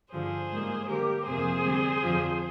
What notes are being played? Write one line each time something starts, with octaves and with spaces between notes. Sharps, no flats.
G2 D3 F3 G#4 C5
G#2 G3 A#3
D3 G3 A#3 G4 A#4
F2 C3 F3 A#3 G#4 C5
D3 G3 C4
F2 D3 F3